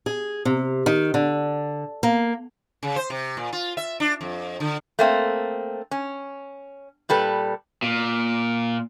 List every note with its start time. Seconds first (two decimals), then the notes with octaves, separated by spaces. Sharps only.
0.06 G#4
0.45 C3
0.86 D#3
1.14 D3
2.03 A#3
2.83 C#3
2.96 C5
3.10 C3
3.37 A#2
3.53 F4
3.77 E5
4.00 D4
4.21 F2
4.60 D3
4.99 A3 A#3 C4
5.91 C#4
7.09 A#2 G3 A4 B4
7.82 A#2